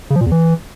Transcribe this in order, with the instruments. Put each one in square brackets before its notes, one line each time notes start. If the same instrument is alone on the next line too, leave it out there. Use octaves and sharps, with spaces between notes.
[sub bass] C#3
F3
A#2
E2
E3